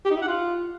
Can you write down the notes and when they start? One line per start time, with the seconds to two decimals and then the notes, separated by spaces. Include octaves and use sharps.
0.05 G4
0.11 D#4
0.17 E4
0.22 F#5
0.28 F4